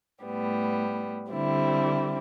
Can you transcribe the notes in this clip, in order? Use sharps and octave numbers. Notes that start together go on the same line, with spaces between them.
A2 G3 B3
D3 G3 C4 E4